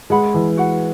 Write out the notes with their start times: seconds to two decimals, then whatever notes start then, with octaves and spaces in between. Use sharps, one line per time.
0.10 G#3 G#4 B4 F#5 B5
0.34 E3
0.57 F#4 B4 F#5